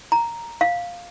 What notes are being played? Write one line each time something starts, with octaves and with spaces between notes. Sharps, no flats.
A#5
F5